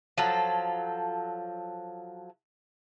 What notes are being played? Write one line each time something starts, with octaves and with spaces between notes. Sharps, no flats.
F3 F#3 A4